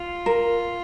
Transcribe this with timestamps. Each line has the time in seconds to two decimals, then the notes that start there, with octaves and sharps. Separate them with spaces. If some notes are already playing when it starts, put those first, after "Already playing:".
Already playing: F4
0.26 A#4